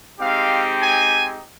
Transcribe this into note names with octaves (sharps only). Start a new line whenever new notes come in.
G#3 C4 D#4 G4 F5
G#5